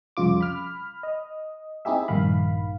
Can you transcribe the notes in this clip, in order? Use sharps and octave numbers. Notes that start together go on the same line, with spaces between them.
C2 F2 C#3 F4 D6
B5 F6
D#5
C4 D#4 E4 G4 G#4 E5
A#1 G2 D#3 F5 B5